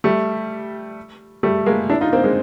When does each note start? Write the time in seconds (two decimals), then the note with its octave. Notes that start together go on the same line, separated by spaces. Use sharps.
0.04 G3 A3
1.43 G3 A3
1.66 G#3 A#3
1.90 D4 E4
2.01 D#4 F4
2.13 A#3 C4
2.24 G#3 A#3